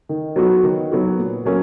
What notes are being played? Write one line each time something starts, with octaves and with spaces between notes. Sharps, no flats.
D#3
F#3 B3 F#4
D#3
F#3 B3 F#4
A#2
F#3 A#3 C#4